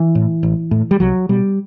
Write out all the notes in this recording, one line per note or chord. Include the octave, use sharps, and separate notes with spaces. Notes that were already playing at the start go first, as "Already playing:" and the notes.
Already playing: E3
A2
A1
A2
G3
C2 F#3
B2 G3